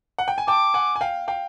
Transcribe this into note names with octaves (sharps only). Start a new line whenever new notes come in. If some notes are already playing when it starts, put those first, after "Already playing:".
F#5
G5
G#5
G5 A5 D6
F#5 G#5
G#5
F5 G5
F5 G5